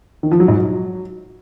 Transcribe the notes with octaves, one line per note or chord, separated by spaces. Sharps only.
D#3
F3
F#3
G#2
F#3